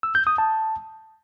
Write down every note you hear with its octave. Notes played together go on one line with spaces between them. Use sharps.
E6
G6
D#6
A5